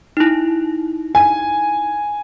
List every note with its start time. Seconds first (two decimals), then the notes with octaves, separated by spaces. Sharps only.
0.17 D#4 E4
1.15 G#5